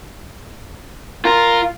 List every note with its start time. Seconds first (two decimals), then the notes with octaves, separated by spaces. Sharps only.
1.25 F4 A#4